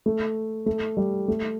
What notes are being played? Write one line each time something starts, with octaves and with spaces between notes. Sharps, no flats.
A3
A3
G3
A3